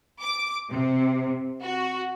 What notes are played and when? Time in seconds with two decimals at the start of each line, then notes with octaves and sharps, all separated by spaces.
0.21 D6
0.70 C3
1.62 F#4